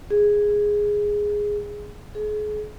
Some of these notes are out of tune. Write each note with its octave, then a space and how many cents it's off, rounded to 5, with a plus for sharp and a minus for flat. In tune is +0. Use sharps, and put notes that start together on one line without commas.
G#4 -5
G#4 +35